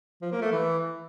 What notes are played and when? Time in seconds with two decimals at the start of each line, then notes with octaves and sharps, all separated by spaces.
0.22 F3
0.32 A#3
0.42 A3
0.52 E3